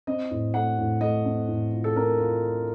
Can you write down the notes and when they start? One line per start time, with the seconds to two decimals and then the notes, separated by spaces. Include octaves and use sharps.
0.07 C4 D#5
0.31 A2
0.54 A3 F#5
0.78 A2
1.01 A3 D#5
1.25 C4
1.48 A2
1.73 F4
1.84 A4
1.96 C4 A#4
2.20 F4